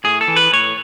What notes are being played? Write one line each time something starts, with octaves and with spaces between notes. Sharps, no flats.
A2 G#4
A4
E3
B4
A2 C#5